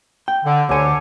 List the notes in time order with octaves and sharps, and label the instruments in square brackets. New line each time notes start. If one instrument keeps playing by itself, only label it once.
[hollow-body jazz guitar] G5
[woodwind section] D3
[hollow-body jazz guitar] D2 G#5 [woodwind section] D3 G4 C#5